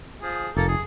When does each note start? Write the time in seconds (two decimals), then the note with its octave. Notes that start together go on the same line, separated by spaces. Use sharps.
0.22 F3 G#4
0.56 F1 A#3 A4 A#5
0.68 G#4